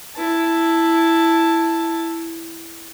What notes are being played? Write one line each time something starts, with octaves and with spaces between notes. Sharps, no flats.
E4 A5